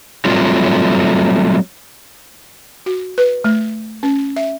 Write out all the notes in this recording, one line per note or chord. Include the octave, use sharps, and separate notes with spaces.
F#3 G3 A3 C4 F4
F#4
B4
A3
C#4
E5